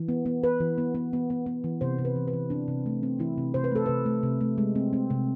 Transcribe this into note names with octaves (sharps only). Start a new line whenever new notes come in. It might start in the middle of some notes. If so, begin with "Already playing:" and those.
Already playing: E3
B3
B3
B3 B4
E3
B3
B3
B3
B3
B3
E3
C3 C5
C3
B4
E3
B4
E3
C4 D4
C3
A3
C4
E3 E4
C3
C3 C5
B4
A3 A4
C3 B4
A3
C3
A3
G#3
C4
C4
C3